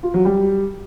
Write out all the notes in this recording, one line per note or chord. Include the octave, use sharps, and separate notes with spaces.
F4
F#3
G3